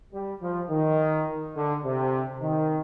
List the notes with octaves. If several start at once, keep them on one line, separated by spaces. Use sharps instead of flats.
G3
F3
D#3
D3
C3
D#3